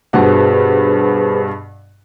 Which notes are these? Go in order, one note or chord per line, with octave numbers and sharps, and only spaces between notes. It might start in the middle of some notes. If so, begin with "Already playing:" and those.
G2 B2 G#4 B4 C5 F#5